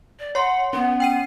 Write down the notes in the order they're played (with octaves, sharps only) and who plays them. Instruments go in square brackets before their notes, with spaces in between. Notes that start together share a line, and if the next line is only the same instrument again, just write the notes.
[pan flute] D5
[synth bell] C#5 C6 [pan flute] F#5
[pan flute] B3 [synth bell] C#4
[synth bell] G5 C7 D#7